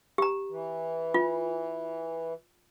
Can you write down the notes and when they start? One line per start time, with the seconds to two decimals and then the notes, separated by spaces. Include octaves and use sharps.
0.18 G4 A#5
0.50 E3
1.14 F4